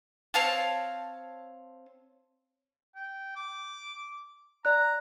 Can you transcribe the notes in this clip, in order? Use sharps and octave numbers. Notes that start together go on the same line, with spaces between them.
C4 C#5 F5 A5
G5
D6
D5 A#5 F#6